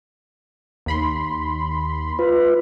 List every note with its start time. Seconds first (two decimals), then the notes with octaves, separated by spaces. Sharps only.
0.86 D#2 B5 C6
2.19 F4 B4